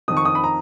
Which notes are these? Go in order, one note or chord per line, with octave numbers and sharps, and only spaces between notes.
F2 D#3 D#6
C#6
D#6
B5
A#5